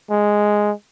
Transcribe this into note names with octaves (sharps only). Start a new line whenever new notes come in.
G#3